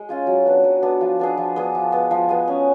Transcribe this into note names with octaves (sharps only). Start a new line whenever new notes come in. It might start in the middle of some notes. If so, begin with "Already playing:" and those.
Already playing: G#3
C#4 F4 G#4
F#3
B3 D4
F#3
B3 D4
F3
B3 D4 G#4
F3
B3 D4 G#4
F3
G#3 B3
F3
G#3 B3
C#4